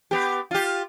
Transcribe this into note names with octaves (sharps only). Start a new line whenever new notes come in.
B3 G4
F4 G4